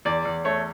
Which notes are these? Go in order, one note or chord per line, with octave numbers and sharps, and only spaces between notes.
E2 D5
E2
A3 C#5